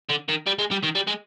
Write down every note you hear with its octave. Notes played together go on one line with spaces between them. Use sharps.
D3
D#3
G3
G#3
G3
D#3
G3
G#3